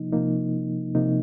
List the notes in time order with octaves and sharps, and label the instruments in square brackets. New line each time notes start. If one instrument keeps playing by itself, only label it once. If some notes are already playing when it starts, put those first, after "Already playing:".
Already playing: [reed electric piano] C3 F3 A#3 D#4
C3 F3 A#3 D#4
C3 F3 A#3 D#4